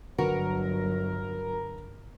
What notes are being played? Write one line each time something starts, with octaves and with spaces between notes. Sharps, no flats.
G1 D3 F#3 F#4 A#4 B4